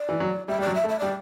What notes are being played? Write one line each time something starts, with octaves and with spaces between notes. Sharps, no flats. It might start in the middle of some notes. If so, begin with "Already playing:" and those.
Already playing: D5
E3
F#3
G3 E5
G3 D5
F#3
E5
A3
E5
G3 D5